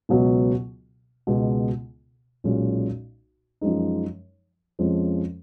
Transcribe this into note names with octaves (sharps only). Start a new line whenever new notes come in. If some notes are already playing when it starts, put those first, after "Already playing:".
C#2 B2 F#3 B3
C#2 B2 G#3 B3
B1 A#2 G#3 C#4
F#2 F3 G#3 D#4
F2 F3 G#3 C#4